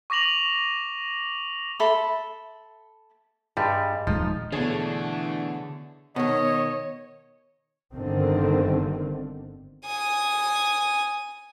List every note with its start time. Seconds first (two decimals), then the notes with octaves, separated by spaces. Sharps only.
0.10 C#6 D6 A#6 F7 F#7
1.80 A4 E5 B5 C6
3.57 G2 G3 G#3
4.07 D#1 F3 G#3 D#4
4.52 B2 D3 E3 A3 D4 G#4 C#5
6.16 B2 D#3 C#5 D#5
7.93 G1 D3 D#3 C4
9.86 G#5 D#6